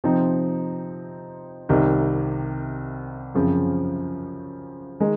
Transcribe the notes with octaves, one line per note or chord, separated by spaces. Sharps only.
C3 F3 C4 D#4
C2 C3 D#3
F#2 C#3 F3 C4
D#3 G#3 D#4